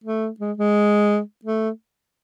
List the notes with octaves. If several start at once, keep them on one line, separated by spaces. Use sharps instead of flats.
A3
G#3
G#3
A3